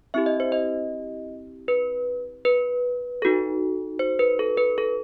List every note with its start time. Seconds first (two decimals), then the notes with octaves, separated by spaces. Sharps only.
0.14 C4 E4 G4 E5
0.26 D#5
0.40 C5
0.52 D#5
1.68 B4
2.45 B4
3.22 D#4 F#4 A4
3.99 C5
4.19 B4
4.39 A4
4.57 B4
4.78 A4